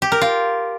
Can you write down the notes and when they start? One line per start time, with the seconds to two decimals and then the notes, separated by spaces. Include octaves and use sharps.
0.02 G4
0.12 A#4
0.21 F4